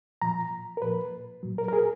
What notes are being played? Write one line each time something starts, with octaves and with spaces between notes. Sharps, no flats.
A#2 F3 A#5
A#4
A#2 F3 B4
A#2 F#3
A#4
A#4
G#4